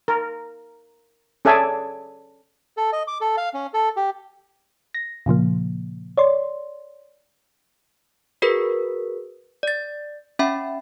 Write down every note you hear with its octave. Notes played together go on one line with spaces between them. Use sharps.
A#4
C#4 G#4 A4 D5 E5 G#5
A4
D#5
D6
A4
F5
C#4
A4
G4
A#6
A#2 C#3 F3 A#3
C#5 D5 C6
F#4 G#4 A#4 B4 B6
D5 A6
C#4 E5 G5 B5